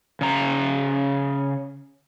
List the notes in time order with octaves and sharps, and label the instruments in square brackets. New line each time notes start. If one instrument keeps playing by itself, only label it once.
[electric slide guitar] C#3 A#5